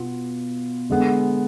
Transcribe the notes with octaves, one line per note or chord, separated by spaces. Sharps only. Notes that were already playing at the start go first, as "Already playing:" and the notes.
Already playing: B2 B3 F4
D3 G#3 B3